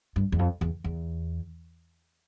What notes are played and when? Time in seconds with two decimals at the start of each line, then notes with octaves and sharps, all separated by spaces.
0.16 G2
0.32 E2
0.39 F2
0.61 E2
0.84 E2